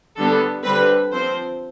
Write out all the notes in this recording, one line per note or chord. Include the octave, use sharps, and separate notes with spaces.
D3 G3 B3 A4
D3 G3 C4 B4
F3 C4 C5